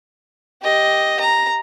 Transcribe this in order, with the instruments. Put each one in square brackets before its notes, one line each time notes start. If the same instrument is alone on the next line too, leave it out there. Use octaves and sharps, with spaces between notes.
[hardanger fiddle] G4 D#5
A#5